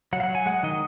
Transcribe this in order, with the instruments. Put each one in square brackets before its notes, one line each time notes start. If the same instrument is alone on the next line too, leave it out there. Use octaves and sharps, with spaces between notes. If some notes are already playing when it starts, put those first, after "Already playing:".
[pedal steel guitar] F#3 F#5
F5
F#5
F#3
G#5
G#3 F#5
D#3 D#5